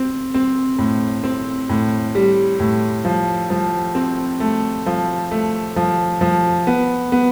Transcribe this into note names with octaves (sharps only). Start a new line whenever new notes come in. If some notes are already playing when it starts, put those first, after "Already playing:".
Already playing: C4
C4
A2
C4
A2
G3
A2
F3
F3
C4
A3
F3
A3
F3
F3
B3
B3